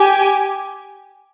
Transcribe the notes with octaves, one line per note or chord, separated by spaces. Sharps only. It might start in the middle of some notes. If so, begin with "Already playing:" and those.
Already playing: G4 G#5